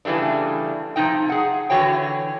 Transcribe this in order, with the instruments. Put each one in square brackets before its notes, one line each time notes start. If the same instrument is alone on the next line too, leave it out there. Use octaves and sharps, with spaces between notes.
[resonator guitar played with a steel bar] C#3 E3 G3 A3 D4
C3 F3 D#4 G5
G#4 F#5
D3 E3 F#4 C#5 G5